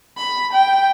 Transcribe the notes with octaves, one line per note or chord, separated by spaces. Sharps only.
B5
G5